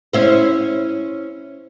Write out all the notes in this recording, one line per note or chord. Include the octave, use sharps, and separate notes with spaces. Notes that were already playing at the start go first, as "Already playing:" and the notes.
C#4 E4 C5